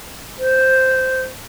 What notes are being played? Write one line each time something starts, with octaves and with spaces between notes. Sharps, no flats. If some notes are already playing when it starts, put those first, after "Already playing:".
C5